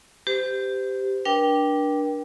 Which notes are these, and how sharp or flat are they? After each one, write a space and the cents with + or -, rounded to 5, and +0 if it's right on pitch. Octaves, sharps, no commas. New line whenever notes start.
G4 +0 C5 -30
D4 +0 A#4 +45 G5 +0